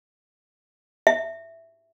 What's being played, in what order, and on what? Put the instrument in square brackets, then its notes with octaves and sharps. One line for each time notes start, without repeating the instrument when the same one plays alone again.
[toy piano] E5